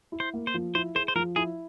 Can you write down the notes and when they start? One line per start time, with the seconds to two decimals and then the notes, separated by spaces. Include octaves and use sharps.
0.12 E4
0.20 C5
0.33 A#3
0.47 C5
0.54 F3
0.75 E4 C5
0.95 G#4 C5
1.08 C5
1.15 F3 A#4
1.36 E4 G#4